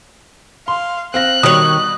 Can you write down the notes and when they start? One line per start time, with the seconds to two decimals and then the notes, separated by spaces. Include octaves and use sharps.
0.68 F5 C6
1.14 C4 F5 F#6 A#6
1.43 B2 D#3 G3 C#5 D#6